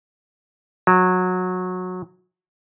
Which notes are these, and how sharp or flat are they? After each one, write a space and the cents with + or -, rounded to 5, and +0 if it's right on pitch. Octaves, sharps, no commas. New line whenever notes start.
F#3 -20